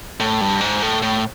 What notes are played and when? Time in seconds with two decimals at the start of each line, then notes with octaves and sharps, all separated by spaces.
0.20 A2
0.41 G2
0.61 G#2
0.82 A2
1.02 A2